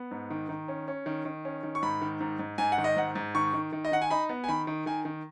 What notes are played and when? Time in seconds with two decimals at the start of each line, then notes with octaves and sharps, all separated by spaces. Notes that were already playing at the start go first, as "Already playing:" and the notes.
Already playing: B3
0.11 G#2
0.30 D#3
0.49 D#3
0.68 C#4
0.88 C#4
1.06 D#3
1.25 D#3
1.45 C#4
1.63 D#3
1.75 C#6
1.83 G#2 B5
2.02 D#3
2.21 G#2
2.39 G#2
2.58 G#2 G#5
2.72 F#5
2.78 D#3
2.84 D#5
2.96 G#2 F#5
3.15 G#2
3.35 D#3 C#6
3.54 D#3
3.73 D#3
3.85 D#5
3.92 D#3 F#5
4.02 G#5
4.10 D#4 B5
4.29 B3
4.44 G#5
4.48 D#3 B5
4.67 D#3
4.86 D#3 G#5
5.05 D#3